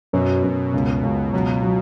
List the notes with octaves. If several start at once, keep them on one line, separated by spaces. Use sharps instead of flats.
F#2 B2
F#2
C#2
C#2
B2 F#3
F#3